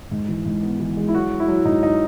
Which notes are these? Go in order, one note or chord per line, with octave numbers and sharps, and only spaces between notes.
G#2
E3
G#2
B3
E3
G#3
E4
F#3 F#4
F#3
E4
F#3
G#2 D#4
D#4